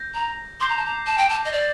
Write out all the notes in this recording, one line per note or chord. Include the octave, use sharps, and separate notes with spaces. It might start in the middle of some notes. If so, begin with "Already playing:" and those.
Already playing: G6 A#6
A#5
C6 D6 G6 C7
A#5
A5
A#5
A5
G5
A5
D#5
D5